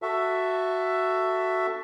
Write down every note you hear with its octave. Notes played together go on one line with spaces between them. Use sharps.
F#4 A4 E5